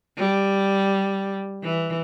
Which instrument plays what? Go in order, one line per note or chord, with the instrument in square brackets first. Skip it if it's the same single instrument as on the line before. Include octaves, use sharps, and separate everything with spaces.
[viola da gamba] G3
E3